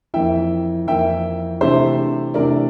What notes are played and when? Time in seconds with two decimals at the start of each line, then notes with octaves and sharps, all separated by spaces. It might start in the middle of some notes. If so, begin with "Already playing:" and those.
0.14 F2 E3 A#3 E4 E5 G5
0.87 F2 E3 A#3 E4 E5 G5
1.61 C3 E3 A3 D4 C5 E5
2.34 C3 E3 A3 D4 A#4 D5